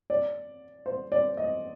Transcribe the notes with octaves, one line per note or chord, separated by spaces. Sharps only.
D5
C5
D5
D#5